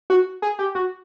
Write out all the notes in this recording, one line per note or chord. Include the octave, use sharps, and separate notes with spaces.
F#4
G#4
G4
F#4